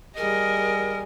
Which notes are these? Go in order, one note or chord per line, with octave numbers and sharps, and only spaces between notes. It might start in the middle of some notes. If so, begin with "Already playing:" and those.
G3 G#4 A#4 D#5